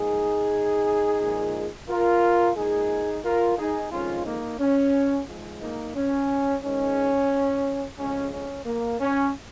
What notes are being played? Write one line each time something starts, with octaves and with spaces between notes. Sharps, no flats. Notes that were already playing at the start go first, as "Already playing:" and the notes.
Already playing: A#2 F3 G#3 D#4 G#4
A#2 F3 G#3
F4 A#4
A#2 G#3 D#4 G#4
F4 A#4
D#4 G#4
F2 D#3 G#3 C#4 F4
A#3 D#4
C#4
G#2 F3 G#3
A#3 D#4
C#4
G#2 D#3 G#3 C#4
F2 C#3 G#3 C#4
C#4
A#3
C#4